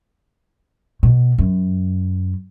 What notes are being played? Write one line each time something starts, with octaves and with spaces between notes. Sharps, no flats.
B2
F#2